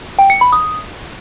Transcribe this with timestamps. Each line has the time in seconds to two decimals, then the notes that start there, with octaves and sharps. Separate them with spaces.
0.19 G5
0.30 C#7
0.41 B5
0.52 D#6